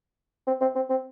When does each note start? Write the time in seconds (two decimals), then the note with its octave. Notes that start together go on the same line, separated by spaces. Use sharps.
0.47 C4
0.61 C4
0.75 C4
0.90 C4